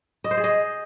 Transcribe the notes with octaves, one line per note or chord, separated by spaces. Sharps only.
D#5
C5
G#4
D#5